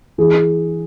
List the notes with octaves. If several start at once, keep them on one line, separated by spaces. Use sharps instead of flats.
E3 G#4